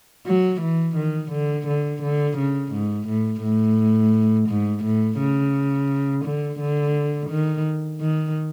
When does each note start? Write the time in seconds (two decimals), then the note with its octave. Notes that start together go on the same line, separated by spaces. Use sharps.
0.26 F#3
0.61 E3
0.96 D#3
1.32 D3
1.67 D3
2.02 D3
2.37 C#3
2.73 G#2
3.08 A2
3.43 A2
4.49 G#2
4.84 A2
5.19 C#3
6.25 D3
6.60 D3
7.30 D#3
8.01 D#3